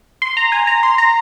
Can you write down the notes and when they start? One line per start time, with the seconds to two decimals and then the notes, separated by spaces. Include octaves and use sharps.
0.22 C6
0.37 A#5
0.52 G#5
0.67 A#5
0.83 C6
0.98 A#5